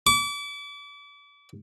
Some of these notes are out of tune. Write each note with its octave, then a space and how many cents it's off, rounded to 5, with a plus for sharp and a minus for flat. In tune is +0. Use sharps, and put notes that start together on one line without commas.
D6 -35